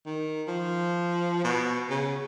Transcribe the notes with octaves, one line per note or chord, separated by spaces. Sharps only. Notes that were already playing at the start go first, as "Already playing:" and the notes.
D#3
F3
B2
C#3